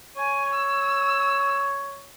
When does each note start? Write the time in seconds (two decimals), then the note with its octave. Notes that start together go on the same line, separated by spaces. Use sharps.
0.17 C#5 G#5
0.54 E6